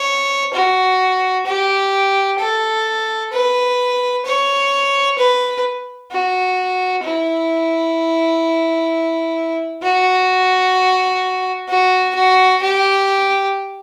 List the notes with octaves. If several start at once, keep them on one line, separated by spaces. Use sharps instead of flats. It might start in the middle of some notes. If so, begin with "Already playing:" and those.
Already playing: C#5
F#4
G4
A4
B4
C#5
B4
F#4
E4
F#4
F#4
F#4
G4